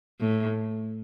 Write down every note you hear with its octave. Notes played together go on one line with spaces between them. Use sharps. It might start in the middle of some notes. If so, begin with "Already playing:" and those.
A2